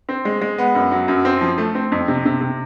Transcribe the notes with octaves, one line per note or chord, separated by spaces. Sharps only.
C4
G#3
G#3
B3
F#2
F#3
F#2
C4
F3
A3
C4
F2
C3
C3
C3